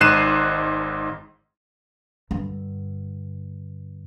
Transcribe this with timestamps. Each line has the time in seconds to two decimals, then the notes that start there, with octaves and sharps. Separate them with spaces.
0.01 G#1 G#2 F#6 C7 D#7 E7
2.31 G2 D3